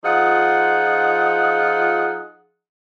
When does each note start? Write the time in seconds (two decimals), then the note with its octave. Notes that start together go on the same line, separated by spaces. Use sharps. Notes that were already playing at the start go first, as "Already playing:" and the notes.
0.05 F3 D#4 F4 G#4 F#5